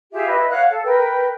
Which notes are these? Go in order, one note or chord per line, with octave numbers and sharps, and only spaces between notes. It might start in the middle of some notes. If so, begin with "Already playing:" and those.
F4 G4 G#4 E5
E4 B4 D#5
C#5 F5 F#5 F#6
A4
A#4 B4 G5